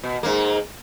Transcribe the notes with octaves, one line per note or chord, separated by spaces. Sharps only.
B2
G#2 A#3